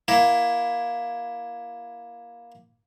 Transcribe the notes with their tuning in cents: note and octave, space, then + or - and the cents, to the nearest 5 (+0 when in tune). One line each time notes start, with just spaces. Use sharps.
A#3 +15 E4 +10